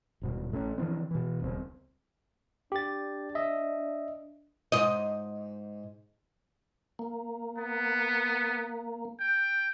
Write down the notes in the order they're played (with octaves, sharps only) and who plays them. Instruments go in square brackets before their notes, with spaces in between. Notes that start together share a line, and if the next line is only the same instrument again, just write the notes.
[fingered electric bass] D#1 G#2 B2
A1 A3 B3 C#4
D3 E3 F3 C4
B2 E3
D#1 C#2 C4
[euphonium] D4 [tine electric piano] G4 A6
[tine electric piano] D#5 E5
[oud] G#2 D#5
[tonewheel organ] A#3
[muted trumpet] B3
G5